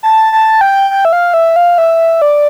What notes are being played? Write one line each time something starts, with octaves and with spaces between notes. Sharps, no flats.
A5
A5
G5
G5
E5
F5
E5
F5
E5
D5